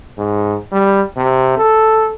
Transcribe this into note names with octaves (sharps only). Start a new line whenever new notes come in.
G#2
G3
C3
A4